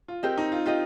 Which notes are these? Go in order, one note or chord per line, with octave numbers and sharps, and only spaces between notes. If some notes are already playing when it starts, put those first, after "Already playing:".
F4
C4 G4 A#4 D#5
D#4
F4
F4 G4 A#4 D#5